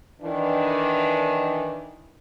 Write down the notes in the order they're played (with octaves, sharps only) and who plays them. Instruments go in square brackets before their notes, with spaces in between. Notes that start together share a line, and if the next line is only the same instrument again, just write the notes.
[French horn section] D#3 E3 D4